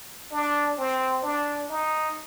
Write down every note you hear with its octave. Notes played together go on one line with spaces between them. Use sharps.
D4
C4
D4
D#4